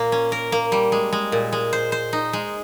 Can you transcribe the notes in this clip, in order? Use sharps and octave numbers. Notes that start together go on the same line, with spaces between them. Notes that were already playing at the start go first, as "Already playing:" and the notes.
Already playing: A#2 A#3
C#4
A#4
A#3
G3
G#3
G#3
A#2
G#3
C5
C5
D#4
G#3